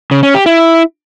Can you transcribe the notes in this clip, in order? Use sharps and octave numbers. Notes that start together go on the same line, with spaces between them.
C#3
C#4
G4
E4